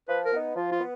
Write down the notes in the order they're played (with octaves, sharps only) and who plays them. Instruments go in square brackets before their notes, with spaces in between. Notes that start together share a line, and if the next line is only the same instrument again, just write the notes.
[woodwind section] F3 [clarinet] B4
[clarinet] A#4
[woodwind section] B3 D#4
[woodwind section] F3 [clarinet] F4
[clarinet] F4
[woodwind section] B3